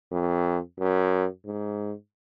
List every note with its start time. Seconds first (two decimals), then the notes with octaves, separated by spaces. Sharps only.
0.11 F2
0.79 F#2
1.45 G#2